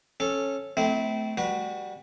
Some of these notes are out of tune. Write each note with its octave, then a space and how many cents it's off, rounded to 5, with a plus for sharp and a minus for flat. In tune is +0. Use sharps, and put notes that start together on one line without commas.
C#4 -15 A4 -10
A3 +0 C4 -25 E4 -35
G3 +15 F#4 +0 B4 -30